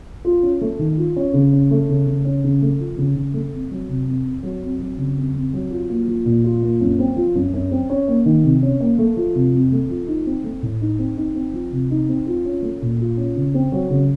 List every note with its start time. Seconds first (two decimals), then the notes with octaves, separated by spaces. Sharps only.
0.25 F4
0.43 C#4
0.61 A3
0.79 D#3
0.97 F4
1.16 C#4
1.33 C#3
1.53 C#4
1.71 A3
1.89 C#3
2.06 C#3
2.25 C#4
2.44 C#3
2.62 A3
2.79 F3
2.98 C#3
3.16 C#3
3.34 A3
3.52 F2
3.71 F#3
3.89 C3
4.07 F2
4.25 F2
4.43 F#3
4.62 F2
4.80 F#3
4.98 C#3
5.17 F2
5.34 F2
5.53 F#3
5.70 F4
5.89 A#3
6.08 F3
6.26 A#2
6.44 F4
6.62 A#3
6.81 F#2
6.99 C4
7.16 F3
7.35 F#2
7.54 F#2
7.71 C4
7.90 C#4
8.08 A#3
8.25 D#3
8.44 C3
8.63 C#4
8.80 A#3
8.98 A3
9.16 F3
9.35 C3
9.53 F2
9.72 A3
9.89 F3
10.08 D#4
10.26 C4
10.44 A3
10.63 A2
10.81 D#4
10.99 C4
11.17 D#4
11.35 C4
11.53 F3
11.72 C3
11.91 D#4
12.09 C4
12.27 F4
12.45 C#4
12.62 A3
12.82 A#2
12.99 F4
13.17 C#4
13.36 C#3
13.54 C4
13.72 F#3
13.90 C#3